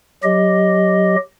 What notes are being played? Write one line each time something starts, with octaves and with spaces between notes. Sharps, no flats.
F#3 G4 D#5